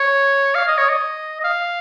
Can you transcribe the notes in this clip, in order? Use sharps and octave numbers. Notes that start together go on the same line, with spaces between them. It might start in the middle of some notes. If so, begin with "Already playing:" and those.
Already playing: C#5
F5
D#5
C#5
D#5
D#5
F5